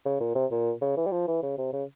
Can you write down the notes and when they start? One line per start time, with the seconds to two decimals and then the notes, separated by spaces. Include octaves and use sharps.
0.05 C#3
0.21 A#2
0.35 C3
0.51 A#2
0.82 C#3
0.97 E3
1.07 G3
1.12 F3
1.28 E3
1.43 C#3
1.58 C3
1.73 C#3